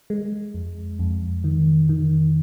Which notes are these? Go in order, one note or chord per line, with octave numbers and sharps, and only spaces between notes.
G#3
F2
F2
D#3
D#3